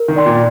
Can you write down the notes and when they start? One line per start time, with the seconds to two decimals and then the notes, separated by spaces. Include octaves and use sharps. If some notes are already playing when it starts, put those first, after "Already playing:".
Already playing: A#4
0.08 D#3
0.16 D5 G5 C6
0.26 A#2